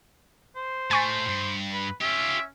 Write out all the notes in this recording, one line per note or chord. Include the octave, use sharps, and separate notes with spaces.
C5
A2 A3 G#5 C#6 A6
G2
B4
C#4 F4 G4 E5